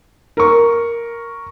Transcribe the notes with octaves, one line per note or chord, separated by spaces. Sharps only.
A#4 C#6